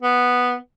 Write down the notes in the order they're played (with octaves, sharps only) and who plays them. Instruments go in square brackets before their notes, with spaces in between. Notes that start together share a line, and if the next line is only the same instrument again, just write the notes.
[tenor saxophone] B3